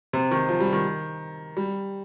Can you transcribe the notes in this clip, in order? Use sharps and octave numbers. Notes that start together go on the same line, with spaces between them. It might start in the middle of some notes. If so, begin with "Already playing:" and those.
C3
D#3
F3
G3
D#3
G3